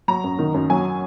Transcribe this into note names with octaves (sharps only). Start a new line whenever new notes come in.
F#3 A#5
F#2
D#3
F#2
F#3 G#5